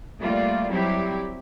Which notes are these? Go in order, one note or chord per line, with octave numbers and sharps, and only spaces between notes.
G3 A3 A#3 F4 D5
F#3 G3 C4 E4 G4